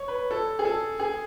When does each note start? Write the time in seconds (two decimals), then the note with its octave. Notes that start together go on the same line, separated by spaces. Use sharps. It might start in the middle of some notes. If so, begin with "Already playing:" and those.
Already playing: C#5
0.08 B4
0.31 A4
0.59 G#4
0.65 A4
1.00 G#4